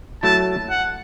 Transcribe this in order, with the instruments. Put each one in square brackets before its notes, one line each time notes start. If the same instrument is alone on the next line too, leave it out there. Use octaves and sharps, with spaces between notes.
[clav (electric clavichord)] F#3 A3 E4 [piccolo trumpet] A5
[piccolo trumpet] F#5